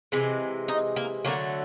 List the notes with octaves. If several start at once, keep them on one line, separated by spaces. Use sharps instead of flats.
C3 E3 G#3
D#4
A#3
D3 F#3 A3 A#3